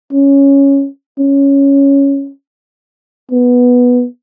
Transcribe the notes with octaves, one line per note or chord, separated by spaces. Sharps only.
C#4
C#4
B3